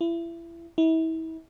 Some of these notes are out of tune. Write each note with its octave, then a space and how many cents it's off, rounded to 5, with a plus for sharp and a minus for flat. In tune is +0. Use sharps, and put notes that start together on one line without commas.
E4 +30
E4 -35